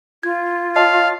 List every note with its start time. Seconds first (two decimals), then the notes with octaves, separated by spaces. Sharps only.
0.23 F4 G#6
0.76 C#5 D#5 F5 A5